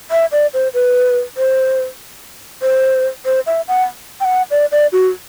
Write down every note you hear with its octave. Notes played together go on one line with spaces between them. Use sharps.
E5
D5
C5
B4
C5
C5
C5
E5
F#5
G5
F#5
D5
D5
F#4